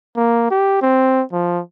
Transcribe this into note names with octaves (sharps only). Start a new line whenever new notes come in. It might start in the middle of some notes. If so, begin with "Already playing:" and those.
A#3
G4
C4
F3